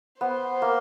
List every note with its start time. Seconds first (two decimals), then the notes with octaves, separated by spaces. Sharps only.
0.20 B3 C5
0.62 A#3